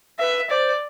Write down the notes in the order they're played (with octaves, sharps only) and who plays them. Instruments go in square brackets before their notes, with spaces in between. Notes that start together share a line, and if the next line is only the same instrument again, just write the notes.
[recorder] B4 [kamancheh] E5
[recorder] C5 [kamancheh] D5